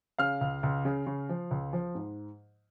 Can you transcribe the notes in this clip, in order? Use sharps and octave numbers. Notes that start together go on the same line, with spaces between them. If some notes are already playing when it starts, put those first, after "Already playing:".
C#3 F5 F6
C#2
C#2
C#3
C#3
F3
C#2
F3
G#2